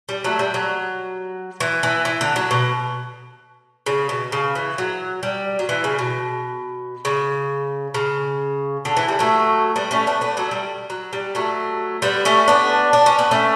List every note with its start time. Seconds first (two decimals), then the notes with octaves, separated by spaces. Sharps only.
0.09 G3
0.24 F#3 A3
0.39 G3
0.54 F#3
1.60 E3
1.83 E3
2.05 E3
2.21 D3
2.36 F#3
2.51 B2
3.86 C#3
4.09 B2
4.32 C#3
4.55 E3
4.78 F#3
5.23 G3
5.59 F#3
5.69 E3
5.84 C#3
5.99 B2
7.05 C#3
7.94 C#3
8.85 D3
8.97 E3
9.08 G3
9.19 F#3 A3
9.76 G3 B3
9.91 A3 C#4
10.07 B3 D4
10.21 B3 D4
10.37 F#3 A3
10.51 G3
10.90 F#3
11.13 G3
11.35 F#3 A3
12.02 G3 B3
12.25 A3 C#4
12.48 B3 D4
12.93 D4
13.06 C#4
13.19 B3
13.31 A3 C#4